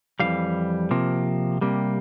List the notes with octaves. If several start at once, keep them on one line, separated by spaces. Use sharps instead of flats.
F2 C3 E3 G3 F5
C3 F3 A#3
C3 G3 A#3